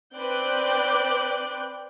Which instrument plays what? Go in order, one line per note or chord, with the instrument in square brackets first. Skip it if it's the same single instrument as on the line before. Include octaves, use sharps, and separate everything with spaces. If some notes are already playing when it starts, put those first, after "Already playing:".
[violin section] C4 B4 D5 D6 F#6 G6